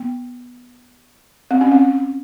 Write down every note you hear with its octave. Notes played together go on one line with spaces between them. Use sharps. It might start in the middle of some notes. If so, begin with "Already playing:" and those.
Already playing: B3
C4
C#4
C4